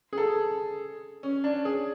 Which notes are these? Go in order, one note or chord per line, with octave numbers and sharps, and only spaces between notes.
G#4
A4
C#4
D4
G#4